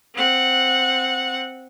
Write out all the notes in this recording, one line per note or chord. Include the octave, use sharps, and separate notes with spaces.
C4 F#5